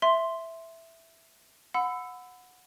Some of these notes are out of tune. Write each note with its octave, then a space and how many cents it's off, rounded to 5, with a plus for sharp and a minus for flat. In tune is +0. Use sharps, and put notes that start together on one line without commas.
E5 +0 C6 +0
F#5 -20 B5 +30 E6 +0